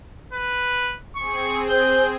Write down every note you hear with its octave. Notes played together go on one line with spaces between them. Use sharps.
B4
C4 G#4 C#6
C5 G6